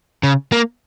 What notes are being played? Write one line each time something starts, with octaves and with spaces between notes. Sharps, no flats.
C#3
A#3